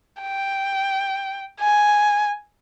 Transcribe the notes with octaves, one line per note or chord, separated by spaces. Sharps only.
G5
G#5